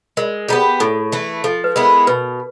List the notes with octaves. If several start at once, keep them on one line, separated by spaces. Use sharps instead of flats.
G#3 A#4
B3 D#4 G4 G#4
A2 A4
E3 A3
F3 A4
B4
G#3 B3 E4 A#4
B2 B4